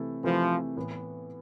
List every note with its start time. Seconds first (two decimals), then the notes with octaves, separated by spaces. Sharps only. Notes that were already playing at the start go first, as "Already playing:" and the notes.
Already playing: C3 E3 A3 E4 A4
0.23 C3 E3 F3 A3 E4 A4
0.77 A2 E3 B3